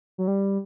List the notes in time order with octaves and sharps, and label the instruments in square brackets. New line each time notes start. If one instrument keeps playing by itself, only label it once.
[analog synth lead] F#3
G3